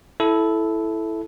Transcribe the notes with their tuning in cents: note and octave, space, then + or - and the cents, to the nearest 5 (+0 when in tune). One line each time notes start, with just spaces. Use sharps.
E4 +0 A4 -10